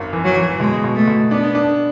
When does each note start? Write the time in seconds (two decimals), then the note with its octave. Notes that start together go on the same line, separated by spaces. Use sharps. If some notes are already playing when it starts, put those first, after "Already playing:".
Already playing: G#1 F#2
0.13 E3
0.24 F#3
0.36 E3
0.60 B2 G#3
0.84 B2
0.95 A3
1.07 B2
1.31 B3 D4
1.55 D4